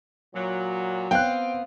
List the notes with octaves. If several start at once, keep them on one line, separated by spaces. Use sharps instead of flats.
A#2 F#3
B3 C4 F5 G5 F#6